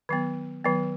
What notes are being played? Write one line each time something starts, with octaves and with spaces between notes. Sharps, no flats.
D#3 F#3 B3
D#3 F#3 B3